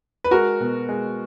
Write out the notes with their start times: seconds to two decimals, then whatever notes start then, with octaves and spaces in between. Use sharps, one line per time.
0.24 B4
0.31 G#3 F#4 A#4
0.60 B2
0.89 G#3